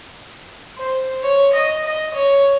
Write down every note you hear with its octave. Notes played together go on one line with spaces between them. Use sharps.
C5
C#5
D#5
D#5
C#5